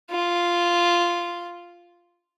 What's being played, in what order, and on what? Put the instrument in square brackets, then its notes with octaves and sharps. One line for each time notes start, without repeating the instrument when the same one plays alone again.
[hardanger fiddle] F4